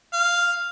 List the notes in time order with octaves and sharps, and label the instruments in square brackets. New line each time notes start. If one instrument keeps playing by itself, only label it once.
[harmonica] F5